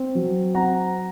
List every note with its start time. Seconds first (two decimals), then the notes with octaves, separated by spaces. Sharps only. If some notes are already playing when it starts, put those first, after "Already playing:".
Already playing: C4
0.15 F#3
0.54 C4 F#5 A#5